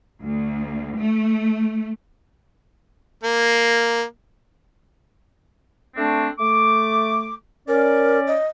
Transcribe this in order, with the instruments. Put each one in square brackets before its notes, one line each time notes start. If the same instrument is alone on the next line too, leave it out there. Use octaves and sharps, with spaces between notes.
[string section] D2
A3
[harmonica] A#3
[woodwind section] A3 C4 D4
A3 D6
[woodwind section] C#4 D5 [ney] A#4
[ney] D#5